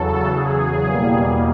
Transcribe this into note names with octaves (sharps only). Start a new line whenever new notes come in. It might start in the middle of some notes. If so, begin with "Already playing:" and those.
Already playing: E2 C#3 F#3 A4
G#4
E2 B2 G3 A#3